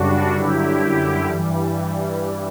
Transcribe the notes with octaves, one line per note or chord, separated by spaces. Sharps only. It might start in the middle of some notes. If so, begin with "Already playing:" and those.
Already playing: F#2 C#3 G3 D4 F#4
G2 D3 F#3 E4 G4
F#2 D3 G3 E4 G4
G2 E3 G3